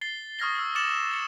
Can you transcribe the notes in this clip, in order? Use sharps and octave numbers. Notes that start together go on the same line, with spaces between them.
A6 C7 G7
C#6 D#6 F6 G#6 A#6 G7
E6 F6 F#7
D6 F6 A6 C#7 E7 F#7
A6 C#7